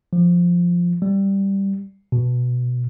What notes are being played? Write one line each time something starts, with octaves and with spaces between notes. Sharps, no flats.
F3
G3
B2